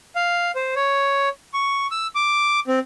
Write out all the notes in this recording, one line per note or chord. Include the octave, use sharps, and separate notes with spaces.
F5
C5
C#5
C#6
E6
D6
C4